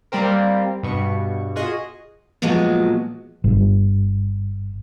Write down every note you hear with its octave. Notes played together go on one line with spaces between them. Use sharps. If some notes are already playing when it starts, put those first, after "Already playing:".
G3 A#3 C4 A#4
G2 B2 C#6
F4 F#4 G#4 D#5
A#2 F3 F#3 G#3 B3 F#4
G1